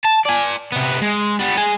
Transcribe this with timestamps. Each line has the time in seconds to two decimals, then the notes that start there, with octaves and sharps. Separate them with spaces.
0.05 A5
0.26 D5 G#5
0.72 C3 B3
1.02 G#3
1.39 G3 B3
1.57 G#3 G#5